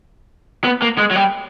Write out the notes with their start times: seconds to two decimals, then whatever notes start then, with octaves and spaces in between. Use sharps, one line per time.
0.64 B3
0.82 A#3
0.98 G#3
1.11 F#3
1.15 G3